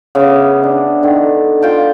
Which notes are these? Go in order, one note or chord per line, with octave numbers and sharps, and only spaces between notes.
C#3 B3 E5 D6
D4
D3 D#3
F4 G5 A5